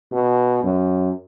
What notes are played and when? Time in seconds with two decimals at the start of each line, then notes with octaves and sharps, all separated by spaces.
0.12 B2
0.63 F#2